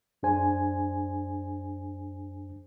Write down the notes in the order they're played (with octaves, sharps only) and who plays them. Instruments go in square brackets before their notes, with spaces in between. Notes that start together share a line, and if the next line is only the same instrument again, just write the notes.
[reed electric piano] F#2 D4 G#4 C5 G#5